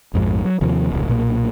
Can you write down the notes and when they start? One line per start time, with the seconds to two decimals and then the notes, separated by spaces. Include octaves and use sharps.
0.14 A#1 F2 G#2
0.45 F#3
0.61 D#2 C3 F3
0.91 D#1 C#2
1.08 B1 A#2 A#3